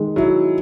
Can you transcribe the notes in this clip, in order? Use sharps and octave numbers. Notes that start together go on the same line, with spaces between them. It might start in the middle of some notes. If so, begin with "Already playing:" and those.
Already playing: D#3 G#3
F#3 E4